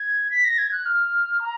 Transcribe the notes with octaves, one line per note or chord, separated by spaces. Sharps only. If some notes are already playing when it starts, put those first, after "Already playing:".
Already playing: G#6
B6
A#6
G#6
F#6
F6
A#5